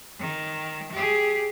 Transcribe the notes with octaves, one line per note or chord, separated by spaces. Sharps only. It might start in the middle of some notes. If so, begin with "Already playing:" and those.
D#3
G4 G#4